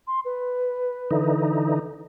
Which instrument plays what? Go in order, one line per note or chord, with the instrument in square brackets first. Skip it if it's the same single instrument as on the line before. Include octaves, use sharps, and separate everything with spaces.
[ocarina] C6
B4
[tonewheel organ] D3 E3 D#4